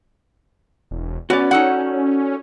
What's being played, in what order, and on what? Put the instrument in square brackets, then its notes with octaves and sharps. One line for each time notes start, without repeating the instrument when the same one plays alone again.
[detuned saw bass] E1
[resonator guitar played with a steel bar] B3 [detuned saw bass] C#4 [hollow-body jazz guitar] F#4 D5
[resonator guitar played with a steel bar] D#4 A4 F#5